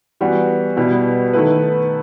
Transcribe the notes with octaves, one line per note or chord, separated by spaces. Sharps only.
E3 G3 B3 F#4
B2 G3 B3 E4
D#3 A3 E4 B4